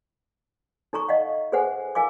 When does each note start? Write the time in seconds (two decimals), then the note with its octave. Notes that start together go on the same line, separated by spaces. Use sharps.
0.93 D#4 A4 A#5 C#6
1.09 D#5 F5 F#5
1.52 G#4 A4 B4 C5 F#5 G#5
1.95 E4 A#4 F5 G#5 D6